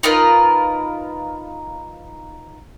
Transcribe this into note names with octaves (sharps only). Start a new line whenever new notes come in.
D#4 F4 A#4 B4